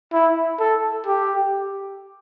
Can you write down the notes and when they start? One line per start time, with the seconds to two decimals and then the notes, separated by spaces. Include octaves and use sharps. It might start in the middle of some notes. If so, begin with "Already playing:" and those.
0.13 E4
0.60 A4
1.07 G4